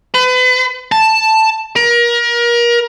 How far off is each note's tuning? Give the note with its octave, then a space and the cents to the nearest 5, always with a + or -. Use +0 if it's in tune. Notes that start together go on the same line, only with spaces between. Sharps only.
B4 +35
A5 +5
A#4 +30